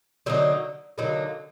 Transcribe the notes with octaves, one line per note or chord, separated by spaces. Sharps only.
D3 F#3 A#3 D#4
D3 F#3 A#3 D#4